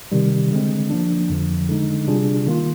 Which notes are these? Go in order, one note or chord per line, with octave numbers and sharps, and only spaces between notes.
C3 D#3 G3
D3 G#3 C4
F3 A#3 D4
F2 D3 F3
D3 G#3 D#4
C3 G3 D4 F4 G#4
D#3 A#3 F4